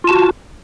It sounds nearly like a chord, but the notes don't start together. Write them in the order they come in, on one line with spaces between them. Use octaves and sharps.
F4 A5 F#4